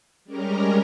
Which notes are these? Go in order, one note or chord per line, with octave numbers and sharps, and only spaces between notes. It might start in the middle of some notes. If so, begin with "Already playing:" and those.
G3 G#3 C#4 G4 A#4 A#5